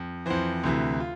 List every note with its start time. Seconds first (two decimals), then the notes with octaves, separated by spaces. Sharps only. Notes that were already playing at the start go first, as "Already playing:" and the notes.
Already playing: F2
0.26 F2 E3 C5
0.64 D2 C3 E3
1.00 F4